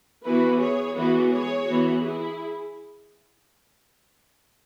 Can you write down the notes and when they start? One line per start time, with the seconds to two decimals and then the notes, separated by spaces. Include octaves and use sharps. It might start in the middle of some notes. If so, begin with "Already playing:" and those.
0.24 E3 B3 F#4 B4
0.60 G#4 C#5
0.96 E3 G#3 B3 F#4 B4
1.32 G#4 C#5
1.68 E3 B3 F#4
2.03 E4 G#4